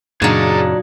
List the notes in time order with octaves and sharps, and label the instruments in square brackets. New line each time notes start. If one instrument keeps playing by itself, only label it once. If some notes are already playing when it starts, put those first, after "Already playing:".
[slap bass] F#2 C#3 [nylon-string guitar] A#2 F#3 [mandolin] D4 D#4 [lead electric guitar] G#4 A#5